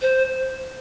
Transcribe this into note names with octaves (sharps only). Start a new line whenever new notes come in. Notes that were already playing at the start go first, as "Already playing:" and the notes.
C5